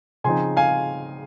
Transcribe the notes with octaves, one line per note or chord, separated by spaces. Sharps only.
C#3 F3 C4 D#4 G#5 C6
F5 G#5